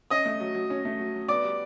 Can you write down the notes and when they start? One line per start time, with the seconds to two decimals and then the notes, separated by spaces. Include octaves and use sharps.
0.10 C#4 D#5 D#6
0.26 A3
0.40 F#3
0.55 F#3
0.70 C#4
0.85 A3
0.99 F#3
1.14 F#3
1.29 B3 D5 D6
1.44 G3